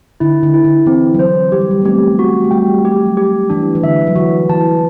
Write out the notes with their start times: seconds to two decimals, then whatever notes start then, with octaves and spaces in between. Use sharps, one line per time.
0.20 D3 E4
0.43 D3
0.54 E4
0.65 D3
0.86 E3 C4
1.14 F#3
1.19 E3 C5
1.52 G3 G4
1.61 F#3
1.71 G3
1.82 B3
1.85 A3 C4 G4
2.19 F#4
2.44 A3
2.51 G3 G5
2.85 A3 G4
3.06 F#3
3.17 G4
3.50 E3 D4
3.75 E3
3.83 D3 E5
4.07 F#3
4.16 E3 F#4
4.49 E3 A5